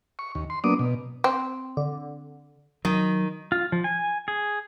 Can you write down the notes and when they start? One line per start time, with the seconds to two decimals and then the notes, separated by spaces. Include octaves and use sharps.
0.19 C#6
0.35 D#2
0.50 C6
0.64 F#3 A#3 B3 D4 D6 D#6
0.79 B2
1.24 C4
1.77 D3
2.85 D#3 F#3
3.52 F4
3.72 F3
3.84 G#5
4.28 G#4